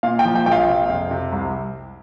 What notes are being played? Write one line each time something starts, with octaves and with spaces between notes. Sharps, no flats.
A#2 F5
G5
F3
G5
A#1 G5
F5
C3
F2
C3
C2